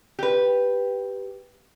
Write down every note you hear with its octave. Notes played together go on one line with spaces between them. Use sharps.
G4 B4